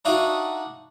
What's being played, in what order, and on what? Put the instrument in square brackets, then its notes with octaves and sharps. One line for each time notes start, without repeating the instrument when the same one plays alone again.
[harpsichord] D4 D#4 F#4 E5 F5 D#6